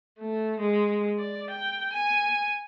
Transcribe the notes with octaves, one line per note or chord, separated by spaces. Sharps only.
A3
G#3
D5
G5
G#5